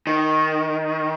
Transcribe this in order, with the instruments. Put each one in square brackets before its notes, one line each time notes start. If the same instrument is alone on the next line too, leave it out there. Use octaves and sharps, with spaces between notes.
[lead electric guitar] D#3